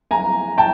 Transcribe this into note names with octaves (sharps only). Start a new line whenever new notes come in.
G#5 A#5
G5 A5